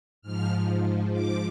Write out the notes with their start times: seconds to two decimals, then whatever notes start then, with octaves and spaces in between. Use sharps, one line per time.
0.22 G#2 F3 F6
1.12 D6